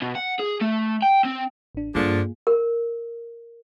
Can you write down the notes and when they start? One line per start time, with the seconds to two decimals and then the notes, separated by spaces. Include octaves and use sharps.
0.02 B2
0.15 F#5
0.40 G#4
0.62 A3
1.02 G5
1.24 C4
1.75 A1 D4
1.95 G2 D3 F3 A#3 D4 F4 G#4
2.47 A#4